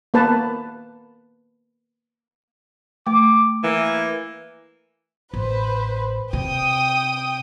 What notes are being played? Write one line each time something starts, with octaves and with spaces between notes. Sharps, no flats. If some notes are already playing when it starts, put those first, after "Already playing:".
A#3 B3 B4 A5
A3 D6
E3 A#3
A1 B4 C5
C3 G5 D#6